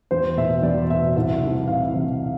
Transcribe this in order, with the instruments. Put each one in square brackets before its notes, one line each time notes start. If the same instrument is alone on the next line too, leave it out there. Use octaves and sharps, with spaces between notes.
[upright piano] E2 C5
B2 E5
E2 D5
B2 E5
C2 E5
C3 E3
C2 F5
C3 E3